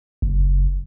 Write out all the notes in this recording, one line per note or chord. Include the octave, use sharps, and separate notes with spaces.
F#1